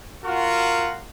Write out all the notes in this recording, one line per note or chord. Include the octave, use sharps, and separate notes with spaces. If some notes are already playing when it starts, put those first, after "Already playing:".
F4 F#4 A#4 F#5